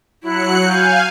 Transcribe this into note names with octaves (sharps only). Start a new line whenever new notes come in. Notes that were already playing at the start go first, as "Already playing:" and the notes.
F#3 E4 F#6 C#7
F5 G#5 G6